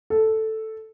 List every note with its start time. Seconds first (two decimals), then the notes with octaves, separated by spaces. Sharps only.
0.10 A4